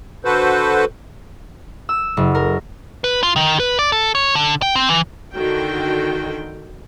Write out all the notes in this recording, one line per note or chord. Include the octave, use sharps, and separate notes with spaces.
D3 F#4 A4 B4 C5
E6
F#1
A#4
B4
F4
D#3
B4
D5
A4
C#5
D3
G5
C4
E3
D3 D#3 F#4 G5